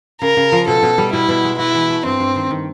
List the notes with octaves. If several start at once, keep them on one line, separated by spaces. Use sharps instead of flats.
C#3 A#4
C#3
F3
B2 A4
B2
G3
B2 E4
B2
G#3
E4 F#4
E3
A3
G2 C4
G2
D#3
D#3